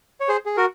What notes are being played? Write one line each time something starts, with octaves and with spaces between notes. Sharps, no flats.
C#5
G#4 C5
G#4
F#4 A#4